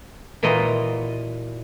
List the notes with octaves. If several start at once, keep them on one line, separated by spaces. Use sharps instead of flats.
A#2 E3 F4 F#4 D#5 A#5